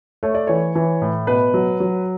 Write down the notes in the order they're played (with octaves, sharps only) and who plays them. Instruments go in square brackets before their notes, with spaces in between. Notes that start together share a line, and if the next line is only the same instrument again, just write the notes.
[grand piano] A3 C#5
D5
E3 C#5
E3
A2
B2 B4
F#3
F#3